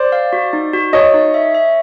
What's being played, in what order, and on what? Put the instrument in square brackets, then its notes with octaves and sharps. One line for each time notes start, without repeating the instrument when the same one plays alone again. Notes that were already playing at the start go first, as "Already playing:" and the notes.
Already playing: [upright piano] C5 D5
[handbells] F5
F#4
D#4
F#4
[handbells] F#4 [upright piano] C#5 D#5
[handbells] D#4
E5
E5